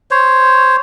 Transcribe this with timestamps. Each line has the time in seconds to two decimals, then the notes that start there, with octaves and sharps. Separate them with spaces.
0.11 C5 C#5